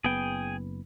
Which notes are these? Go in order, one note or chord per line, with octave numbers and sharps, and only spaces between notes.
F#1 B3 G#4 G5